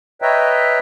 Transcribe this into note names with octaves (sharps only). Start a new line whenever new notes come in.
B4 C#5 D#5 E5 G5 A#5